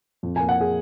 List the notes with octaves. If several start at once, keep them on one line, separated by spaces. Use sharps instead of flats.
F2
A#3 G#5
F#5
G#4